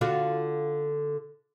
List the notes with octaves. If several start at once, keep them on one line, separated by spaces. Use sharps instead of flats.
D3 F4 F#4